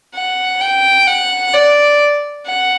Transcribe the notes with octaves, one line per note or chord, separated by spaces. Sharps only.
F#5
G5
F#5
D5
F#5